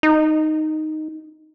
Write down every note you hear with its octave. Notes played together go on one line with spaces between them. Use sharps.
D#4